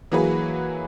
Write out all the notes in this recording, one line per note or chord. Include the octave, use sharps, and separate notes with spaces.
E3 F#3 A#3 F#4 G#4 B4